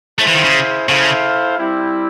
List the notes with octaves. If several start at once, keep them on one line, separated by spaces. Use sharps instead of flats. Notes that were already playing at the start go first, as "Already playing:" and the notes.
A3 E4 G#4 C5 F5
E3
D#3
C#3
C#3 E4 A4 C5 F5
G3 C4 E4